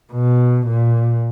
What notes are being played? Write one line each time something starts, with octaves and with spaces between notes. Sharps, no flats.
B2
A#2